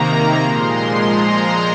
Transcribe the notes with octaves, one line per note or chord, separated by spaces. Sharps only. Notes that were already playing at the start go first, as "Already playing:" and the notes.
Already playing: C3 D#3 A#3 A#5
A#2 F3 G#3 C6
A#5
C6